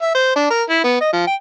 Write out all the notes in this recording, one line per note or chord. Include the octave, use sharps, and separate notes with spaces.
E5
C5
D4
A#4
E4
B3
D#5
F3
G5